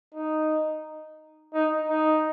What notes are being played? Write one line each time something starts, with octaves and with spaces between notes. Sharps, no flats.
D#4
D#4
D#4